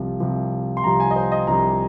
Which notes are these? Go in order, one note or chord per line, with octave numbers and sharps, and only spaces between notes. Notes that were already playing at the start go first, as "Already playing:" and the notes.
Already playing: C2 C3 F3
C2 C3 F3
C6
C2 C3 F3 A#5
G#5
D#5
C5
D#5
C2 C3 F3 A#5